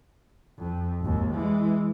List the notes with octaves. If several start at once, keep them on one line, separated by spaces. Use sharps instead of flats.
F2
G#1 D#2
E3 G#3